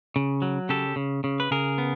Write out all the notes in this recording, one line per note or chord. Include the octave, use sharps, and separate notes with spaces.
C#3
F#3
C#3 G4 A4
C#3
C#3
B4
C#3 G#4 A#4
B3